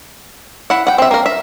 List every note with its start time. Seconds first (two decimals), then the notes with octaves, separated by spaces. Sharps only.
0.70 E4 F#5
0.87 F#5 G5
0.98 C4 E5
1.11 A#3 A#4
1.26 E5